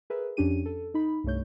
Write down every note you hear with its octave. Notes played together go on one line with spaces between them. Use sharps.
G#4 A#4 B4 E5
F2 C#4 D4 G4 D#7
A4
D#4 B5
C2 G2 A3 C#5 G6